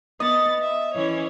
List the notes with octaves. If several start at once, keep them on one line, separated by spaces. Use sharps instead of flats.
B3 D#5 A6
E5
E3 C#4 C#5